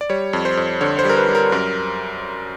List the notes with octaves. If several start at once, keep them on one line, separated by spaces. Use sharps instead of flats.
D5
G3 C#5
F2
C5
F2
D3 C#5
C5
G3 A#4
B4
G3
A#4
F#2 A#4